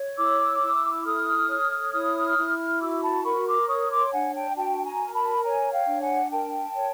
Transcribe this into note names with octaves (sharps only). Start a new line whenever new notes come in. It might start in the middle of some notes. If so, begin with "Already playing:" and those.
Already playing: C#5
E4 D6 E6
E4
A4 D#6 F6
C#5
E4 D#6 F6
E4
F#4 D6 E6
A5 B5
A#4 B5 C#6
C6 D6
C#5 C#6 D#6
C6 D6
D4 F#5 G#5
G5 A5
F#4 G5 A5
G#5 A#5
A#4
A5 B5
C#5 G#5 A#5
F5 G5
D4
F#5 G#5
A#4 G5 A5
C#5